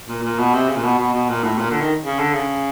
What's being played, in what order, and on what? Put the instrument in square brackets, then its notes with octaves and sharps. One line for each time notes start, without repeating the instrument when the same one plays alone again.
[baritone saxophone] A#2
A#2
B2
C3
C#3
A#2
B2
B2
B2
A#2
A2
A#2
D3
D#3
C#3
D3
C#3